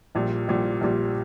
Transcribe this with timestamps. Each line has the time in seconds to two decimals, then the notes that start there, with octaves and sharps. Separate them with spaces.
0.15 A#1 A#2 G3
0.48 A#1 A#2 G3
0.81 A#1 A#2 G3